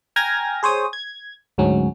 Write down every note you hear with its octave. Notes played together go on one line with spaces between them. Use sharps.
G5 G#5 A#5 F6 G#6 A#6
G#4 C5 C#5 D#6
G#6
D2 G#2 F#3 C#4